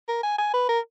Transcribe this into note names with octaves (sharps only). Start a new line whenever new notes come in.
A#4
G#5
G#5
B4
A#4